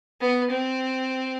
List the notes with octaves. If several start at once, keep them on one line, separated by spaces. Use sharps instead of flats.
B3
C4